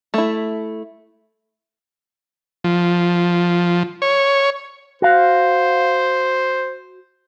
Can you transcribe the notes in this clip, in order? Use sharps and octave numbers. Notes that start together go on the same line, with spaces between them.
A3 E4
F3
C#5
F#4 C5 F5